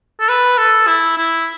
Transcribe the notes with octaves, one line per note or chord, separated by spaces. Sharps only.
A4
B4
A4
E4
E4